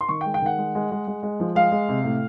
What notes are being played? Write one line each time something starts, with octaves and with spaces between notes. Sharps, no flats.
C6
D#3 C#6
G5
G#3
G5
D#3 F#5
G#3
G#3
G#3
G#3
G#3
F3
G#3 F5
G#3
C3
A2